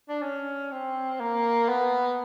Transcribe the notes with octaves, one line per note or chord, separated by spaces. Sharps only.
D4
C#4
C4
A#3
B3